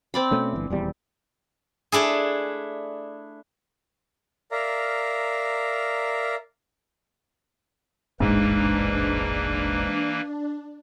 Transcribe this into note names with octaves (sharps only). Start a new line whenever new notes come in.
C4 D5 B5
B2 A3 C#4
G1 E3
D#1 E2 G3
A3 D4 E4 G#4
A#4 D5 E5 F5 A#5
E1 A1 G#2 E3 A#3 D4 B4